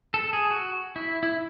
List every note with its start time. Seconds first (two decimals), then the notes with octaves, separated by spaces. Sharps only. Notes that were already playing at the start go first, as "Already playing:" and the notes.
0.14 A4
0.33 G#4
0.51 F#4
0.96 E4
1.23 E4